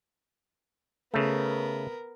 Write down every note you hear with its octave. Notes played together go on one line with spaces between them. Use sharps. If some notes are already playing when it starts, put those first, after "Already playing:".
C#3 A3 B3 A#4